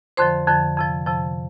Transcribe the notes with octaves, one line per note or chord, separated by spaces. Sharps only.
F2 D3 F3 C5 C6
F2 D3 F3
F2 C3 F3
F2 C3 F3